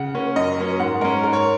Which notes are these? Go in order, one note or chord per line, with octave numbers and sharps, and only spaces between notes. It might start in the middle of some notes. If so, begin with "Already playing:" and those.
Already playing: C#3 F#5
A#3 C#4
F#2 D#5
F#3 A#3 C#4
G#2 F#5
G#3 C#4 A#4
G#2 A#4
C#5